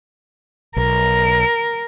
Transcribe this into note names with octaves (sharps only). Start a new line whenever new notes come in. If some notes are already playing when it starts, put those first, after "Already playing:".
B1 A#4